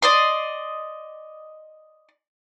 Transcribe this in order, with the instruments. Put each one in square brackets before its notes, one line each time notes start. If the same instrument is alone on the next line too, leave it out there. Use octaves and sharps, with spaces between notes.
[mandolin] D5 D#5 C6